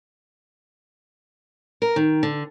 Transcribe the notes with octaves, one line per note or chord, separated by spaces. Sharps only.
A#4
D#3
D3